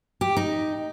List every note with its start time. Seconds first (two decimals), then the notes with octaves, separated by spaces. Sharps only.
0.21 G4
0.36 D#4